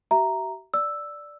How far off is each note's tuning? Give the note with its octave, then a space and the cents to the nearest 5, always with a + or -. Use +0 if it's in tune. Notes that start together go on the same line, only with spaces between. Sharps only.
G4 -45 E5 +0 A#5 +0
D5 +0 E6 +0